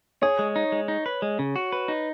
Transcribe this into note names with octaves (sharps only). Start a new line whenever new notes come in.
G#4 C#5
G#3
D#4
G#3
D#4
B4
G#3
C#3
F#4
B4
D#4